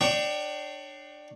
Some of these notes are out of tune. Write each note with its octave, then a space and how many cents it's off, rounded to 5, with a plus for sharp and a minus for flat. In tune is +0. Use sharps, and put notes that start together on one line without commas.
D4 +20 C#5 +0 G5 -15